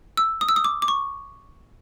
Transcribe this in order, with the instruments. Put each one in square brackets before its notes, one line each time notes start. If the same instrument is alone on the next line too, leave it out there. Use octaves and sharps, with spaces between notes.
[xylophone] E6
D#6
E6
D#6
D6
D6
C#6